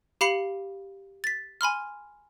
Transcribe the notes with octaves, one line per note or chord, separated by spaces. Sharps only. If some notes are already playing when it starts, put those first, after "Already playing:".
G4 F5 B5 C7 C#7 F#7
A6 B6
G#5 B5 C6 F6